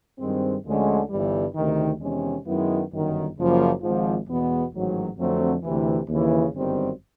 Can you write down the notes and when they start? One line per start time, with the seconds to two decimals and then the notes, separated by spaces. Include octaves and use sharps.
0.19 G2 D#3 G#3 C4
0.65 D2 D3 F3 G#3 C#4
1.10 G1 G2 E3 G3
1.55 D2 C3 D#3
2.00 E2 C3 D#3 G#3 C#4
2.45 F#2 D#3 G#3 B3 E4
2.91 G1 F#2 D#3
3.36 F#1 F#2 C#3 F3 A#3
3.82 G#1 G#2 F3
4.28 E2 B2 G#3 B3
4.73 A1 G#2 D#3 F#3
5.18 F2 D3 F#3 A3 C4
5.63 D2 C3 E3
6.08 D#2 C#3 E3
6.54 G1 F#2 D#3 G3 C4